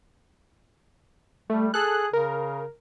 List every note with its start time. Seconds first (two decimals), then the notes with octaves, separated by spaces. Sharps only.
1.50 G3 A3
1.74 G#4 A4 F#6
2.13 C#3 A#4